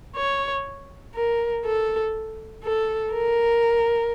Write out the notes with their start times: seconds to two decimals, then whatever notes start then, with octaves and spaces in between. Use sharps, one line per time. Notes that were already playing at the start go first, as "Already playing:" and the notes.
0.16 C#5
1.15 A#4
1.65 A4
2.64 A4
3.13 A#4